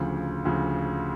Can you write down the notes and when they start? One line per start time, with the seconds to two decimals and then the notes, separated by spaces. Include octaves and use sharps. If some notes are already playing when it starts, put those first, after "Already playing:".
Already playing: D2 C#3 F3
0.45 D2 C#3 F3